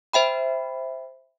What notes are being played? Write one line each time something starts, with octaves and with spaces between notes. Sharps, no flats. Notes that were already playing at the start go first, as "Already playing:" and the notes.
C5 E5 G5 B5